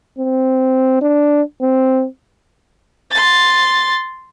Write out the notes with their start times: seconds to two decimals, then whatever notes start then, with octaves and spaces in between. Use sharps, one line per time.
0.19 C4
1.02 D4
1.61 C4
3.11 C6 A6